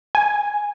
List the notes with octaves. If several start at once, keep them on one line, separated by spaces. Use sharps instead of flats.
G#5